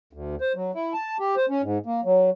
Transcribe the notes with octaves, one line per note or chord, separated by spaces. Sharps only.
D2
C5
F#3
E4
A5
G4
C5
C#4
G#2
A#3
F#3